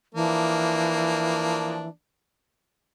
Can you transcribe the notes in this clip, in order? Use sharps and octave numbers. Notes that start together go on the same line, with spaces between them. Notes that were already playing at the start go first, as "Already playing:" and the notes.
E3 F3 A#3 D4